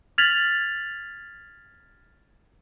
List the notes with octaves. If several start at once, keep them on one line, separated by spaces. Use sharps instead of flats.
F6 G#6 A6 B6 F7 F#7